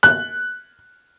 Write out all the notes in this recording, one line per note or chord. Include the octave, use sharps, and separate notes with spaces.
F#6